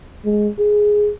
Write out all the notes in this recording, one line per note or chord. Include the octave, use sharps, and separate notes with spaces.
G#3
G#4